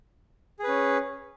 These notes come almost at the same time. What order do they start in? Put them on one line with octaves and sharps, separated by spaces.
G#4 B4 C#4